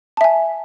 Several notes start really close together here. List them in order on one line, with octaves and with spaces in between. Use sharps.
A5 E5 G#5